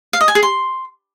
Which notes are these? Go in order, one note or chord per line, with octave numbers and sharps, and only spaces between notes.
F5
D#5
G#5
G#4
C6